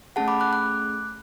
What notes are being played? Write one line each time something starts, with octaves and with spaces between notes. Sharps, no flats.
A3 C#4 G#4 F#5 A5
B5 D6
D6 F#6
D6 F#6